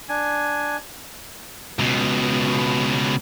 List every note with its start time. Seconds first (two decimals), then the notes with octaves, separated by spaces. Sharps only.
0.09 D4 G#5
1.79 C#2 B2